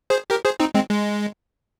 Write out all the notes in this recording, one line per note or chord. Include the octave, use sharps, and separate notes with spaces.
G#4 C5
G4 A#4
G#4 C5
C4 D#4
G#3 C4
G#3